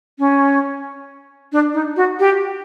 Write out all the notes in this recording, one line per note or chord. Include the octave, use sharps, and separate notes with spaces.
C#4
D4
D#4
F#4
G4